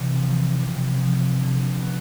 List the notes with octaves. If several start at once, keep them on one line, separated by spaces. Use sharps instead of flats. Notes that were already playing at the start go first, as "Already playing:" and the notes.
Already playing: C3 E3
F3
C3
F3
D3
B3